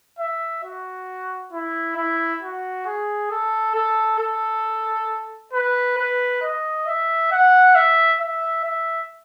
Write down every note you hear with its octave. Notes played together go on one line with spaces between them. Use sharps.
E5
F#4
E4
E4
F#4
G#4
A4
A4
A4
B4
B4
D#5
E5
F#5
E5
E5
E5